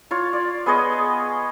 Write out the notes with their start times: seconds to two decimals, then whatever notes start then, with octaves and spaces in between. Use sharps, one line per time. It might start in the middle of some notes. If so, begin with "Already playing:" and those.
0.11 F4 C#5
0.33 D5
0.66 B3 G#4 C#5 D#5